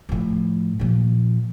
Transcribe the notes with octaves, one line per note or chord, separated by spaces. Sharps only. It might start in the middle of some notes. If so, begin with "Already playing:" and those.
A2 F3
A#2 F3